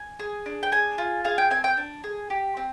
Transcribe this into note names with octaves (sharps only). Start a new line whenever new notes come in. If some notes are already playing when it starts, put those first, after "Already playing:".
Already playing: G#5
G#4
D4
G5
G#4 G#5
F4
G#4 F5
G5
C4 G#5
G5
D4
G#4
G4
C4